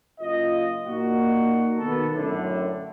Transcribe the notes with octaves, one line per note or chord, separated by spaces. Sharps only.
F#1 F4 D#5
A#2 A#3 D#4 F#4
B2 D#3 B3 F#4 A4
F#2 A2 D3